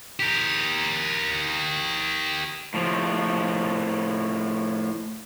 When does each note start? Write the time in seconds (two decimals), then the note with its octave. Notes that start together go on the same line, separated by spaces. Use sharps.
0.20 G4 A#4
2.74 A2 F3